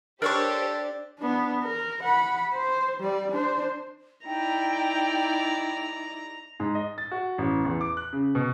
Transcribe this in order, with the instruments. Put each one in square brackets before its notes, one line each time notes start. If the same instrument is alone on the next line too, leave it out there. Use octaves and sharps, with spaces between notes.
[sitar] D4 [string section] G4 C5 [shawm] A4 [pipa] A#4 C#5 C#6
[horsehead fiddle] B3 D4
A#4
F#5 B5
C5
G3 D5
D4 C5
[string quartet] D#4 E4 D5 [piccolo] G5 [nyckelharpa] A#5
[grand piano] G#2
D#5
A6
F#4
A1
E2
D6
F#6
C#3
B2